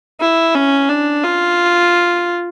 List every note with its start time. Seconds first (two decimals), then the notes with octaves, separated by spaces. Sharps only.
0.20 E4
0.55 C#4
0.89 D4
1.24 F4